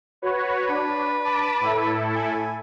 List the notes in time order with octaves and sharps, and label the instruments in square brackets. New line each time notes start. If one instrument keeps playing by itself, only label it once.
[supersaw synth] F#4 B4 C#5
[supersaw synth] D4 [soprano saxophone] B4
[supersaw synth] A5 B5 D6
A2 E4 A4
[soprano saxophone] G#5